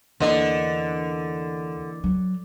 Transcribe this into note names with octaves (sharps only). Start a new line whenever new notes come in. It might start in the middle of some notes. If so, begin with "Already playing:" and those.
E2 D3 E3 A#3 D#5
F#3